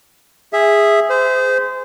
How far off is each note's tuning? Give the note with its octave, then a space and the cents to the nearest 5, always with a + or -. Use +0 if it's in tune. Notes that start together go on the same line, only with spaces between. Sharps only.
G#4 -10 E5 +0
G#4 +0 C5 -25